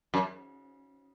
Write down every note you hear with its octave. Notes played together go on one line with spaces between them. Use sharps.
F#2